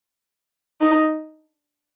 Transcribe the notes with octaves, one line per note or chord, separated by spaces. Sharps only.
D#4